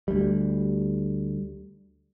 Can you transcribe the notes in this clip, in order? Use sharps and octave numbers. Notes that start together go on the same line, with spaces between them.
D2 G3